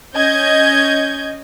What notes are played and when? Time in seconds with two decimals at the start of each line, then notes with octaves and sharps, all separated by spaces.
0.15 C#4 D#5 G6 G#6